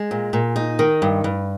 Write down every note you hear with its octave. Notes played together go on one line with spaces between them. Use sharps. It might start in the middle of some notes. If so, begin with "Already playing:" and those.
Already playing: G#3
A#2
A#2
D#4
D#3
G2
G2